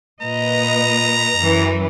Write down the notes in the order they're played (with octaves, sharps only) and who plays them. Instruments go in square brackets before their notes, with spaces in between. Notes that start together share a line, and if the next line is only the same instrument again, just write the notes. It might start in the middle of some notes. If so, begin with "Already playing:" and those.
[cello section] A#2 B4 D#5 [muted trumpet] A#5
[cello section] F#2 E3